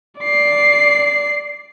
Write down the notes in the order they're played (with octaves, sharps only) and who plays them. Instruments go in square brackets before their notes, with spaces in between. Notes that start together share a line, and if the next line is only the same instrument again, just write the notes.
[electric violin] D5 C7